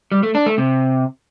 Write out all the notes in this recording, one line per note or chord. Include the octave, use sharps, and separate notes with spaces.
G3
A3
D4
A3
C3